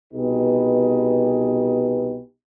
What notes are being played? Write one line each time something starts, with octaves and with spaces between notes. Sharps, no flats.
C2 B2 D#4 G4 G#4 B4